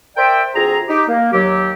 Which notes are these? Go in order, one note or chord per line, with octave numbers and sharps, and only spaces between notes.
A#4 C5 D5 E5 G5
D2 C4 F4 G#4 A#5
D#4 G4
A#3
D#2 F#3 G4